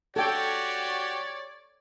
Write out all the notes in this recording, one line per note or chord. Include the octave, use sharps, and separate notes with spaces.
F#4 G4 A4 C#5 D5 G5